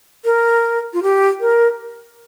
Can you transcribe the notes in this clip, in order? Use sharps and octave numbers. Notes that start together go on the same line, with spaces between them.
A#4
F4
G4
A#4